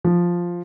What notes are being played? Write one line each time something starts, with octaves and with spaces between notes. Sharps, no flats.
F3